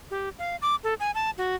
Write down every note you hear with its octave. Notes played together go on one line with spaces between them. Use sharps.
G4
F5
D6
A4
G#5
A5
F#4